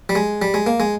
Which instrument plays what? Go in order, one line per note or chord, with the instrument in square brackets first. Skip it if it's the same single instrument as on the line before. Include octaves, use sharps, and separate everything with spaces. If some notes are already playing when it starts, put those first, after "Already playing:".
[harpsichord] G3
G#3
G3
G#3
A#3
G#3